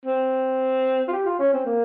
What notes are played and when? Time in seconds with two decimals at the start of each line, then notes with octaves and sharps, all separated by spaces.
0.06 C4
1.08 F4
1.13 G4
1.26 F4
1.39 C#4
1.53 C4
1.66 A#3